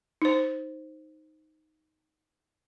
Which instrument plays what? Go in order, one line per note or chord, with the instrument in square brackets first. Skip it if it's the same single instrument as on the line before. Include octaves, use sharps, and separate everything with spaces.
[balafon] D#4 C5